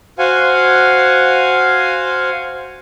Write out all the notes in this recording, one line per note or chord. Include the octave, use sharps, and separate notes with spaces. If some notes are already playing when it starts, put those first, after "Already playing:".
F#4 C5 F5 F#5 G#5